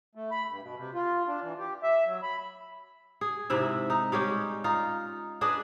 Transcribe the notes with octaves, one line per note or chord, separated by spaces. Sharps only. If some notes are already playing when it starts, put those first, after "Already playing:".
A3
B5
G2
B2
C3
F4
D4
E3
G4
E5
F#3
B5
G#4
G#2 C3 E4 E5
D#4
G3 G#3 C#4 G4
D#4 F4
D4 G#4 B4 D#5